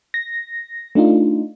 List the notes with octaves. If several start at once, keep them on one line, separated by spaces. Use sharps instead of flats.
A#6
A3 D4 D#4 F4